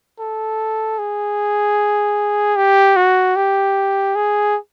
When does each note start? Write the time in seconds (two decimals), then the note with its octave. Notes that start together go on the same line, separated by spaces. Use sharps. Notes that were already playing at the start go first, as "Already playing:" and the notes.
0.19 A4
0.99 G#4
2.57 G4
2.96 F#4
3.36 G4
4.16 G#4